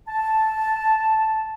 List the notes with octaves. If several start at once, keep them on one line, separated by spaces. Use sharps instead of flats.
A5